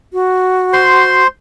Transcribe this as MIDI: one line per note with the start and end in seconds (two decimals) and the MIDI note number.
0.13 1.24 66
0.73 1.27 72
0.73 1.27 84